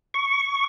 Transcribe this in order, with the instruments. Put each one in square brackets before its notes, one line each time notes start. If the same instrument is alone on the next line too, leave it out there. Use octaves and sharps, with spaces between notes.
[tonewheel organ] C#6